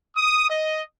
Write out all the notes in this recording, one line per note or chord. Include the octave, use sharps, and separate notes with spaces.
D#6
D#5